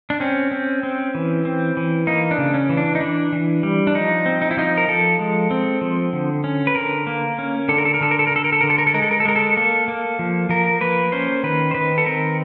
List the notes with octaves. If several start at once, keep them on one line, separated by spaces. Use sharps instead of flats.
D4
C4 C#4
C4
C4
E3
C4
E3
A#3 D#4
D4
C#3
C#4
E3
D4
D#4
E3 D4
E3
G3
D4
F3 D#4
C4
D#4
E4
F3 D#4
A#4
F3 A4
G#3
C4
F3
D3
C#4
B4
D3 A#4
A#3
C#4
D3 A4
A#4
A4
A#4
D3 A4
A#4
A4
A#4
D3 A4
A#4
A4
D3 A#4
A4
A#4
A4
G#3 A#4
A4
A#4
A4
G#3 A#4
A4
A#3 A4
A#3
F3
F3 A#4
A#3 B4
C#4 C5
D#3 B4
C5
D#3 B4
A4
C4 A#4